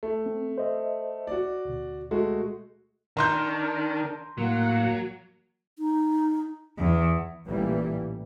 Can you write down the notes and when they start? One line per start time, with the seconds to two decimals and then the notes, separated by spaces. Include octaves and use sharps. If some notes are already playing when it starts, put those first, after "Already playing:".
0.03 A3
0.26 C4
0.58 C5 D#5 E5
1.27 F#4 D5
1.65 D2 B2
2.11 G#3 A3 F#4
3.17 D#3 D4 A#4 A#5 C6 G6
4.38 A2 F#3 A#3 F#5
5.79 D#4
6.77 E2
7.47 A1 A#2 E3 G3